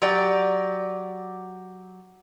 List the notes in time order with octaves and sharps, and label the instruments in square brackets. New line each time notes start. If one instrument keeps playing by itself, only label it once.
[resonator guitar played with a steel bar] F#3 G4 D5